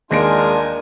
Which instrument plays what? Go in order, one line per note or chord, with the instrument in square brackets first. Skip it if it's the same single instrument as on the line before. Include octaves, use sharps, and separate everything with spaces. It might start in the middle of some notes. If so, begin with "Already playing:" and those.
[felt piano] D#2 A#6 D7 [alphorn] G#3 [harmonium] D4 F4 [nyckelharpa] A#4 G#5